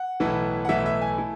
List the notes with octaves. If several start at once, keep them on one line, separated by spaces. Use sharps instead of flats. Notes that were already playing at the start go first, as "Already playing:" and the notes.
Already playing: F#5
B1 A2 E3 A3 E4
F#5
B1 A2 E3 A3 E4 E5
E5
G#5
A3 E4